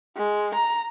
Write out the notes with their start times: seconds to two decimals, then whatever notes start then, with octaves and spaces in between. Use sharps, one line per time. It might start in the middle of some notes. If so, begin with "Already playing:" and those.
0.17 G#3
0.55 A#5